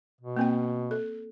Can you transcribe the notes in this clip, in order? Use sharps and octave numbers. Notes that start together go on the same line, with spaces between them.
B2
A#3 C4 G5
A4